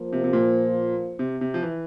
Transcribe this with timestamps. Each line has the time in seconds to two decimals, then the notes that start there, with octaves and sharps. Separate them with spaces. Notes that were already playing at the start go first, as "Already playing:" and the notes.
Already playing: F3 A#3 F4 C5
0.13 C3
0.24 C3
0.33 A#2
1.19 C3
1.41 C3
1.54 F3
1.63 E3